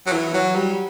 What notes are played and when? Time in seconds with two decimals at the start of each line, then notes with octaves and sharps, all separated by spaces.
0.06 F#3
0.12 E3
0.34 F#3
0.55 G3